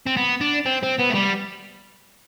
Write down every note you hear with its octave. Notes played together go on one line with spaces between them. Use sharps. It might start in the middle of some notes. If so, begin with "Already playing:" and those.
C4
B3
D4
C4
C4
B3
A3
G3